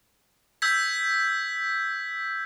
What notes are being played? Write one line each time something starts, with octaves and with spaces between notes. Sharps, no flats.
E6 G6 G#6 B6